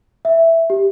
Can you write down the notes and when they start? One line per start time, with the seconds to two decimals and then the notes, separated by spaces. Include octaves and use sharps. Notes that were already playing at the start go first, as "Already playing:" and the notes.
0.25 E5
0.70 G4